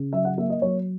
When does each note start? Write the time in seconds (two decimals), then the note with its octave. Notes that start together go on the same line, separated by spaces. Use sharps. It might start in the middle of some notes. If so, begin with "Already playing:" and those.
Already playing: C#3
0.13 F#3 E5
0.25 F#5
0.38 A#3 E5
0.50 D#5
0.62 F#3 C#5